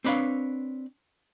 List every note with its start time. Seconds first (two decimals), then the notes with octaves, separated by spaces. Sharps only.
0.04 C4 D4 B4 C#5 F5